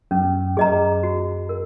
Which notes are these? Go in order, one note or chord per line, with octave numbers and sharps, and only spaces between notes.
F#2 C#4
F#2 G#4 D#5 A#5
F#4
A#4